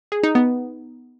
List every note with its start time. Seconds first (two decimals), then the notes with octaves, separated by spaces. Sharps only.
0.12 G#4
0.23 D#4
0.35 B3